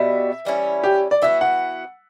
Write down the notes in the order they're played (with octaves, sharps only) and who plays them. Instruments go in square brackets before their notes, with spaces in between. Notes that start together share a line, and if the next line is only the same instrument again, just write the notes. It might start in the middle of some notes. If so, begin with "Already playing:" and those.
Already playing: [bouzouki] B2 G3 B3 [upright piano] E5
[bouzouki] E3 G3 C#4 E4
[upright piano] G4
D5
[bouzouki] E3 B3 F#4 [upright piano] E5
[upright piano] F#5